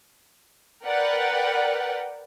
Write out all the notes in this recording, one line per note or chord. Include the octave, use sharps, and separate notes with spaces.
A#4 B4 D5 F#5 G5